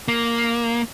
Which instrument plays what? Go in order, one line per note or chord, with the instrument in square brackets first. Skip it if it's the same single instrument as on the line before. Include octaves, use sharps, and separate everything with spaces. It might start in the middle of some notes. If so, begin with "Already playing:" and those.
[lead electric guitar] A#3